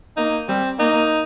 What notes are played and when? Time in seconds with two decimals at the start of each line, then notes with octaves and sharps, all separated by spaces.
0.17 A#3 D#4
0.49 G3 C4
0.78 A#3 D#4